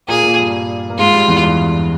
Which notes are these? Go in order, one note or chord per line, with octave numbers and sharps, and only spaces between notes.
A#2 A#3 G#4
A#2 A#3
G2 G3
A#3
G#2 G#3 F4
G2 G3
E2 E3
G2 G3